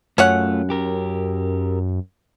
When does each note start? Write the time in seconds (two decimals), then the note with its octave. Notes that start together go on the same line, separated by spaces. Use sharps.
0.18 F#2 A3 C#4 F4 C#5 F#5
0.70 G4 A#4